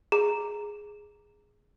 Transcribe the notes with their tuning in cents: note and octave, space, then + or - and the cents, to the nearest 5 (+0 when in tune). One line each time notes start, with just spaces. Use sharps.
G#4 +0 A#5 -10